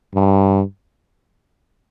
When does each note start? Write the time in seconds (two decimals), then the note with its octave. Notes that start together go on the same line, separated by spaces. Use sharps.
0.15 G2